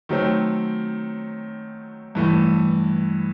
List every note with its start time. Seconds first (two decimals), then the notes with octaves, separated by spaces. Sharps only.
0.09 D#3 F#3 A3 C4
2.15 G2 E3 A3